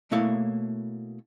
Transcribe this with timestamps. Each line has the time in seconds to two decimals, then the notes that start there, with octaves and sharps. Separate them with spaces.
0.11 B2 A3 A#3 E4 C#5 F5